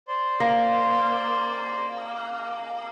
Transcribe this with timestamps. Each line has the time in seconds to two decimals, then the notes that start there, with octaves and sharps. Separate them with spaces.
0.08 C5 D5 C6
0.40 A#3